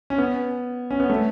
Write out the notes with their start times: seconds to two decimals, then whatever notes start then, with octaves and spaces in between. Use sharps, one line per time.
0.10 C#4
0.18 B3
0.91 C#4
1.00 B3
1.10 A3